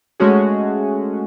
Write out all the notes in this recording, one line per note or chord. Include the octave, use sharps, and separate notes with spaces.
G#3 A3 C#4 F#4 G#4